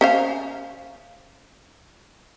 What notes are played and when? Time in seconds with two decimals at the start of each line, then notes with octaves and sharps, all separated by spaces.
0.01 C#4 C5 F5